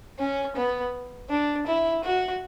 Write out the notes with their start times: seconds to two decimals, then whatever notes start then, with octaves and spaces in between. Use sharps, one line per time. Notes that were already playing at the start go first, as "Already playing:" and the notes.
0.19 C#4
0.56 B3
1.30 D4
1.66 E4
2.04 F#4